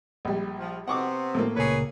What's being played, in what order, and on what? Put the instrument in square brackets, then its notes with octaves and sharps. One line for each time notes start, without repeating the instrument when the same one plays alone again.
[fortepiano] A#1 G3
[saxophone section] F3
[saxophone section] C3 B3 C4 [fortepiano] F#5 C#6 D6
[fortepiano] A2 A3 A#3
[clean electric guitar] C#2 A#2 A#4 [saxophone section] G#4 B4 C#5